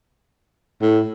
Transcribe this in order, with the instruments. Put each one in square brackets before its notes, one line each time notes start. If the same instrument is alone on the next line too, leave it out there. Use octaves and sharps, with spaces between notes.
[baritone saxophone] A2